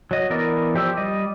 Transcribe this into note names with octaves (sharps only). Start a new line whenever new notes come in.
F#3 D#5
E3 B3 A#4 D5 D#5
F3 G4 D5 E6
G3 D5 D#5